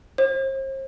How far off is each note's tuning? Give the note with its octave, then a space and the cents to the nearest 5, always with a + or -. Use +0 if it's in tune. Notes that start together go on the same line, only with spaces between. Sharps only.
C5 +40